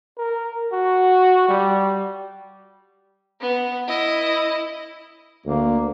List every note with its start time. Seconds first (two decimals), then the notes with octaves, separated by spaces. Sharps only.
0.18 A#4
0.73 F#4
1.49 G3
3.40 B3
3.88 E4 D#5
5.46 D2 A#3